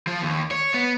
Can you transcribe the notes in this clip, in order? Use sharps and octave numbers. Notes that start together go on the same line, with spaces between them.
F3
D#2
C#5
B3